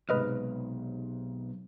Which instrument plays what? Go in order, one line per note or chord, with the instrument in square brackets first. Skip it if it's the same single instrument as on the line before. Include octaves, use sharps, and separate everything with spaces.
[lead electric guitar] B1 [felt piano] G#2 C3 [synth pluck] B4 D#5 F6